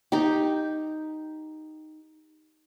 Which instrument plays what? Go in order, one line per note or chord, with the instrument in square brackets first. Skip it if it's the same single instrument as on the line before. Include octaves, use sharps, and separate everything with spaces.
[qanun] D#4 G4